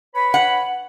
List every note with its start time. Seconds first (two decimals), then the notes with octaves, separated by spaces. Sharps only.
0.15 B4 C#5 B5
0.34 F#5